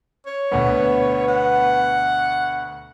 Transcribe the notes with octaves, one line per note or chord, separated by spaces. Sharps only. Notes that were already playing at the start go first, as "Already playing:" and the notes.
C#5
D2 B2 B3
F#5